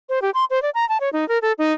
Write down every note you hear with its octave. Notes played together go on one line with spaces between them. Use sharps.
C5
G4
C6
C5
D5
A#5
A5
C#5
D#4
A#4
A4
D#4